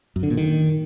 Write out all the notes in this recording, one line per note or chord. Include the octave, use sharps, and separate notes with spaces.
F#2
D3
A#2
D#3